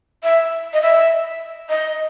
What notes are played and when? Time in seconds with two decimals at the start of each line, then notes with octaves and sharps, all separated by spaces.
0.23 E5
0.73 D#5
0.82 E5
1.69 D#5